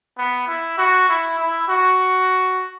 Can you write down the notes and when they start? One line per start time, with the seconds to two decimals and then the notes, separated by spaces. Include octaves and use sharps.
0.18 B3
0.47 E4
0.78 F#4
1.09 E4
1.39 E4
1.68 F#4